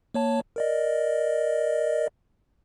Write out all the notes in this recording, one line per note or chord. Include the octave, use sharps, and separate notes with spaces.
A#3 C#5 A5
A#4 D5 D#5